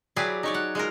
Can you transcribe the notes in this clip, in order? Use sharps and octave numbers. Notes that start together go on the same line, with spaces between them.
F#3 E4 G4 G#4 B4 D5
D#4 C#5 D5
F#5
G#3 F4 A#4